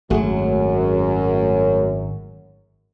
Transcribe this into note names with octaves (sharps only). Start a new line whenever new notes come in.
G#1 F#2 F#3 A3 F#4 G#4